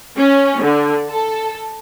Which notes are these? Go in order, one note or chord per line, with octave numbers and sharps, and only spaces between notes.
C#4
D3
A4